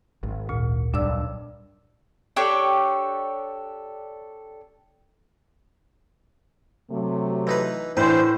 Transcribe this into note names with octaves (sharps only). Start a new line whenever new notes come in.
G#1
D2 A#2
B1 G2 D4 D5 E6
D4 G4 A4 C#5
C3 F#3 A3
E3 D#4 B4
A2 E3 D4 B4 C5